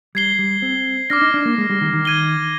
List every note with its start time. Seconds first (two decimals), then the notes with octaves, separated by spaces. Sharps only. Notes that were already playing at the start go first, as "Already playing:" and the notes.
0.15 G3 G#6 C7 G7
0.39 G3
0.62 C4
1.10 D4 D6 F6 A#6
1.22 D#4
1.34 D4
1.46 A#3
1.58 G#3
1.70 G3
1.81 D#3
1.93 D#3
2.05 G#6 D#7 G7